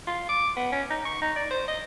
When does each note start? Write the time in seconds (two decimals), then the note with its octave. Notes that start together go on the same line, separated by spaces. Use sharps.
0.07 F4
0.29 D6
0.56 B3
0.72 C#4
0.90 D#4
1.05 C#6
1.21 D#4
1.36 D5
1.50 C5
1.67 D#5